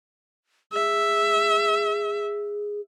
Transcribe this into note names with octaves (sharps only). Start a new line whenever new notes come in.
G#4 E5